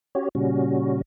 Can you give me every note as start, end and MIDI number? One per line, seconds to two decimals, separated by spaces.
0.15 0.29 61
0.15 0.29 66
0.15 0.29 67
0.15 0.29 73
0.35 1.02 46
0.35 1.02 49
0.35 1.02 55
0.35 1.02 61
0.35 1.02 66